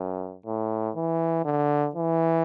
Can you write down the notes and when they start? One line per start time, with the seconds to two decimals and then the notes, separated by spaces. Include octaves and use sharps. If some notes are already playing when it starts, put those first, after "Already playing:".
Already playing: F#2
0.46 A2
0.96 E3
1.45 D3
1.95 E3